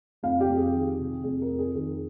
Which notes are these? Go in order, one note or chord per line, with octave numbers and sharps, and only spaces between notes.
F2 F5
G4
F2
G#4
D#3
C3
F2 G#4
A#4
F2
G#4
D#3 G#4